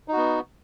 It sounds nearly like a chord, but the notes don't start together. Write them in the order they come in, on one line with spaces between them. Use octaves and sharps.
D#4 F#4 B3